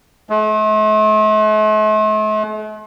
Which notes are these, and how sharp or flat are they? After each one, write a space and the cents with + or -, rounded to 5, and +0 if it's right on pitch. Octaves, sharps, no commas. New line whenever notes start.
A3 -45